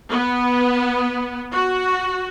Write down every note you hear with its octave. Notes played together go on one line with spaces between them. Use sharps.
B3
F#4